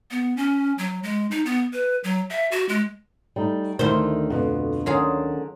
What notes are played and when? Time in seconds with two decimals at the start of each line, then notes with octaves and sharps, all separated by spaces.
0.11 B3
0.37 C#4
0.78 F#3
1.03 G#3
1.31 D#4
1.46 B3
1.73 B4
2.04 F#3
2.30 E5
2.52 F#4
2.69 G#3
3.36 G3 A3 D#4
3.79 D2 D#3 E4 C5
4.30 F2 B2
4.86 D3 D#3 F#3 C#4 F4 G#4